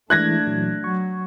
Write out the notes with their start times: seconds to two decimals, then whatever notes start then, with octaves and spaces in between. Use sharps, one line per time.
0.10 E3 G#3 A3 D4 E4 F#6 G#6 A#6
0.46 A#2 E3 F#3
0.84 F#3 C#6